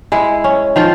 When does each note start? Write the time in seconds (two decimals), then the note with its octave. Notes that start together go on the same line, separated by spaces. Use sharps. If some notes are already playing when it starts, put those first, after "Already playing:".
0.12 G#3 E4
0.44 C#4
0.76 D#3 F3 F4